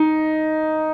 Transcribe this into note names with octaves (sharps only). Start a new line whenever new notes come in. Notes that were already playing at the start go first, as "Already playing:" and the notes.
Already playing: D#4